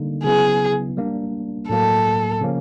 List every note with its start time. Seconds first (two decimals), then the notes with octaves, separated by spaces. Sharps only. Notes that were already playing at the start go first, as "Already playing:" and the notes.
Already playing: D3 G3 A#3 D#4
0.24 C#3 F#3 B3 E4 G#4
0.97 G3 A#3 D4
1.69 A2 F#3 A#3 A4
2.41 C#3 F3 A#3 C#4